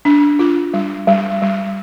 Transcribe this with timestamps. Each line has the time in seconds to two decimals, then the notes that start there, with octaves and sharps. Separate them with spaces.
0.05 D4
0.39 F4
0.74 G3
1.07 G3
1.42 G3